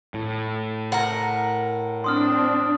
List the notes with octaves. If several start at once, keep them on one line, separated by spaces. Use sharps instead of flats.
A2
A#4 F#5
C4 D4 C6 D#6 F6